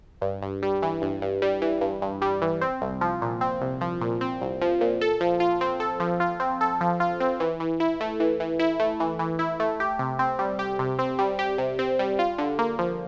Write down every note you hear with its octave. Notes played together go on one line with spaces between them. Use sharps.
G2
G2
G3
E3
G2
G2
G3
E3
G2
G2
G3
E3
C4
C2
F3
A#2
C4
C2
F3
A#2
C4
C2
F3
A#2
A4
F3
F4
C4
A4
F3
F4
C4
A4
F3
F4
C4
E3
E3
E4
A3
E3
E3
E4
A3
E3
E3
E4
A3
G4
C3
C4
G3
G4
C3
C4
G3
G4
C3
C4
G3
F4
D3
A#3
F3